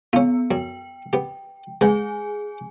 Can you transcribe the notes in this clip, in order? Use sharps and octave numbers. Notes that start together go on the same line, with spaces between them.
B3 C#4 F4
F#2 G5
B3 G4
G#3 B3 G#4 G#5